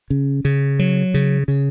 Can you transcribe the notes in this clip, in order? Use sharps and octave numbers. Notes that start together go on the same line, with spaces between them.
C#3
C#3
F#3
C#3
C#3